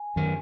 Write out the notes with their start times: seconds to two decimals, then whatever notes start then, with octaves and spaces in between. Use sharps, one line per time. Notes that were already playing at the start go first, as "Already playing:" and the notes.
Already playing: G#5
0.16 F#2 D#3